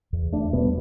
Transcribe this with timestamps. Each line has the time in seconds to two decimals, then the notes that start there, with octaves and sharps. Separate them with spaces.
0.13 E2
0.32 A3 D4
0.53 B2 G3 B3